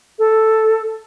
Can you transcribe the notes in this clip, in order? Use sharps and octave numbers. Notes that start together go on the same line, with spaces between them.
A4